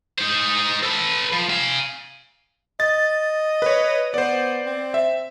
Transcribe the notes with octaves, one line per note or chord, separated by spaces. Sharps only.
D#4 C5
A4 B4
F3
F5 G#5
D#5 A6
B4 C#5
B3 C5 D5
C4
E5